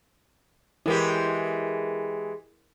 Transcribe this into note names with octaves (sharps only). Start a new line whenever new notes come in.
E3 G#3 E4 G4 A#4